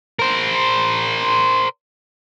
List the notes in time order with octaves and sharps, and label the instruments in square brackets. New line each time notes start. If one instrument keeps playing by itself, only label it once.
[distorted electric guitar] A#4 C5